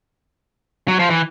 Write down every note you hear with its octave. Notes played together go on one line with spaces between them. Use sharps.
F#3
F3
E3